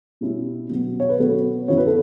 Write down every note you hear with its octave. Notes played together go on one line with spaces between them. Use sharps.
B2 G3 C#4 E4
B2 F#3 B3
C#5
B4
B2 F#3 B3 A4
F#2 E3 B3 E4 C#5
B4
A4